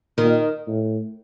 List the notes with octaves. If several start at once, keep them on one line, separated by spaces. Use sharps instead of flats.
A#2 D#3
A2